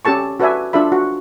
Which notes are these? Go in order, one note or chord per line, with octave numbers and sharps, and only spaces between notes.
C#4 G4 A4 A5 C#6
F#4 A4 B4 D5 E5 G#5
D4 F4 A4 E5 B5
F#4